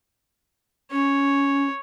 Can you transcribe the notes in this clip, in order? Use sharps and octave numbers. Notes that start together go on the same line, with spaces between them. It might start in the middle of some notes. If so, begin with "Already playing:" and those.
C#4 C#5